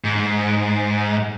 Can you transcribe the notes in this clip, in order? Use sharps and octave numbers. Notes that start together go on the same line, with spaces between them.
G#2